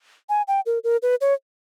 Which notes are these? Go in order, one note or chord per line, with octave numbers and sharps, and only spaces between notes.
G#5
G5
A#4
A#4
B4
C#5